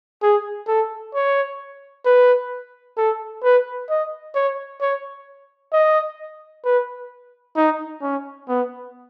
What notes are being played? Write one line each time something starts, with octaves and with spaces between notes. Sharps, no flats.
G#4
A4
C#5
B4
A4
B4
D#5
C#5
C#5
D#5
B4
D#4
C#4
B3